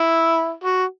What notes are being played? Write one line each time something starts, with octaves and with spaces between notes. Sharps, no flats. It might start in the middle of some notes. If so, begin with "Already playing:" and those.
Already playing: E4
F#4